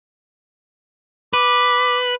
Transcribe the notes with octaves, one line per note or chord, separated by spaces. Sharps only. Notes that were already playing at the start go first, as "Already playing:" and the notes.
B4 D6